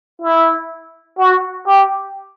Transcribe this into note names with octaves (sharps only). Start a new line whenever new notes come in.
E4
F#4
G4